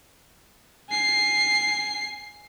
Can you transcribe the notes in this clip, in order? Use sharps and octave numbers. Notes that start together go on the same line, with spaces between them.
G#5 C7